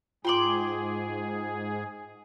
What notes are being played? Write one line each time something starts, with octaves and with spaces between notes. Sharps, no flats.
G#2 F4 G#4 G5 C6 D6 F#7